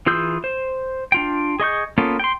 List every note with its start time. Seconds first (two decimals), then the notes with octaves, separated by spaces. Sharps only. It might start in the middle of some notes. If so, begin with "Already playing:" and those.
0.06 E3 F4 G#4 E6 G6
0.44 C5
1.12 D4 F4 G5
1.60 G#4 D#5 C#6 G6
1.98 A#3 B3 C#4 F4 A4
2.19 G5 C6